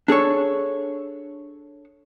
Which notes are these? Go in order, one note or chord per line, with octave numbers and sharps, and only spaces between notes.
D4 G#4 A4 C#5